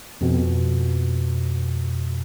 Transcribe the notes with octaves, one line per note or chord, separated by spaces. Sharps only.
F2 B2